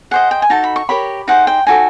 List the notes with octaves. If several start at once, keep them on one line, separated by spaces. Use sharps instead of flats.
G#4 C5 D#5 F#5
G5
G#5
D#4 F#4 A4 A5
B5
C#6
G4 A#4 C#5 B5
D#4 G#4 C5 F#5
G5
D#4 F#4 A4 G#5